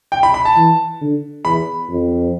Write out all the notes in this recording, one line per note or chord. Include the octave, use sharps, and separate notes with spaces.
G5
B5
B5
A5
E3
D3
E2 B5
F2